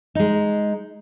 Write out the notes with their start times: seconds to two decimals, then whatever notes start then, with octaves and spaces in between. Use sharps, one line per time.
0.15 G#3 D#4